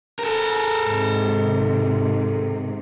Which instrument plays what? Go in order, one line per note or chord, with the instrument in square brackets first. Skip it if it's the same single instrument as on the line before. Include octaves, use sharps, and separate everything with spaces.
[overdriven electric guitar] A4 A#4
[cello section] G#2 C3 D#3